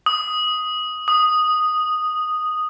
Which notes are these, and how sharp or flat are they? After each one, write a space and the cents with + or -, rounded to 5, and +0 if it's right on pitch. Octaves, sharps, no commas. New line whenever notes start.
D#6 +5
D#6 -5